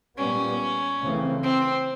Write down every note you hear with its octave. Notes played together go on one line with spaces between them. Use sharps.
A#2 G3 B3 C#4
C#3 E3 A3 C4
C4